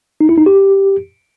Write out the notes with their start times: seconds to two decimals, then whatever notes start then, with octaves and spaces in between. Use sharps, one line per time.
0.21 D#4
0.29 E4
0.38 D#4
0.46 G4